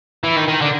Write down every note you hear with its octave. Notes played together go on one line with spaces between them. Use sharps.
E3
D#3
D#3
D3